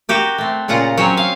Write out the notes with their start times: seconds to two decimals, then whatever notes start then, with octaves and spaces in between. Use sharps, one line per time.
0.09 F#4 G4 A#4
0.38 A3 C4
0.68 A#2 C#3 F4 F#5 A#5
0.97 F#3 C4 C#4 C#5
1.17 F5